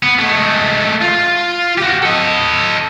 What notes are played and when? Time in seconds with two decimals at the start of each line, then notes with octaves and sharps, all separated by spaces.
0.03 B3
0.19 G#3 A3
1.02 F4
1.78 F#4 G4
2.03 A4 D#5